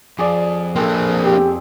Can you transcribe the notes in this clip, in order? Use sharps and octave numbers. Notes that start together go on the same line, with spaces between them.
F2 G#4 D5
A#3 C4 D4 G#4 A4
G4